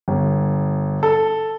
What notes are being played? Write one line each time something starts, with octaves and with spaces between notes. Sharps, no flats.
G1
A4